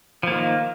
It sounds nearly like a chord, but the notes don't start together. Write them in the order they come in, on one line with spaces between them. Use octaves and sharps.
F3 A#3 D#3